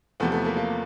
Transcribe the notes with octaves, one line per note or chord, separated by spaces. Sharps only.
E2 C3 F3 A3 B3
A3 B3
A#3
A#3